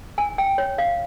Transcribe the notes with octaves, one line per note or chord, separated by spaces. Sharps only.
G#5
G5
C#5
F5